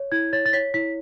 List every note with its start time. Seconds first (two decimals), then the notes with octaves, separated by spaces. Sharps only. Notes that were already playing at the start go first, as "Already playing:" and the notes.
Already playing: C#5
0.12 E4 G#6
0.33 C#5 A6
0.46 A6
0.53 C#5 B6
0.74 E4 B6